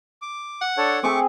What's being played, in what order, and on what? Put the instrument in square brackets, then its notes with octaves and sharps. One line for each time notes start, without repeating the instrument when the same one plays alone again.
[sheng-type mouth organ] D6
[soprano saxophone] F#5
[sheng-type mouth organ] D4 A4 C#5
[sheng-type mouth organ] A3 C#6 D6 [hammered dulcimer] C4 G#4